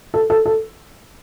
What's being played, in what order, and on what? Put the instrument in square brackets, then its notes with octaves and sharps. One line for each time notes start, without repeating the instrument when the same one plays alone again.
[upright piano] A4
A4
A4